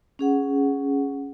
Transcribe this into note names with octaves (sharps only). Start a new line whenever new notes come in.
C#4 G#4 F#5